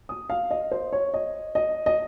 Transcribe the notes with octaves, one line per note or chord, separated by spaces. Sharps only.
D#6
F5
D#5
C5
C#5
D#5
D#5
D#5